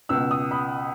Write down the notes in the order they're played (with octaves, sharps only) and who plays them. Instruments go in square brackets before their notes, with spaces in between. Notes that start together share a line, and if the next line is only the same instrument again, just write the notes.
[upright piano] C#2 B2 E6
D#6
B5